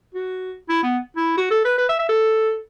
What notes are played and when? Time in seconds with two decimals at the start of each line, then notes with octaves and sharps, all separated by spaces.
0.15 F#4
0.69 E4
0.83 B3
1.17 E4
1.37 F#4
1.51 A4
1.65 B4
1.78 B4
1.89 E5
1.99 E5
2.09 A4